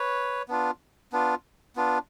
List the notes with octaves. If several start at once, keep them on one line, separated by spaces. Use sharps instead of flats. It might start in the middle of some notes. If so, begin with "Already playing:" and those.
Already playing: B4 C#5
B3 D4 F4
B3 D4 F4
B3 D4 F4